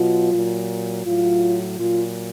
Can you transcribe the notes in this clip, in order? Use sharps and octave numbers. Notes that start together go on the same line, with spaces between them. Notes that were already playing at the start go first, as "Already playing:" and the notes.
Already playing: B2 F#3 F4
A#2 F#3
A2 F#3 F4
A#2 F#3 F4